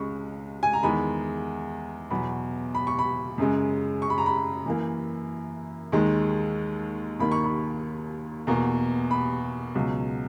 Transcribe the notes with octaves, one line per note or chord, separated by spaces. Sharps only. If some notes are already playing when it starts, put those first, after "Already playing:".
Already playing: C#2 C#3 G#3 B5 C#6
G#5
A#5
E2 D#3 G#3 B5
E2 B2 F#3 B5
B5
C#6
B5
F#2 C#3 G#3
C#6
B5
A#5
B5
F#2 E3 A#3
D#2 D#3 G#3
D#2 D#3 A#3 B5
C#6
B5
E2 B2 A#3 A#5
B5
C#2 B2 F#3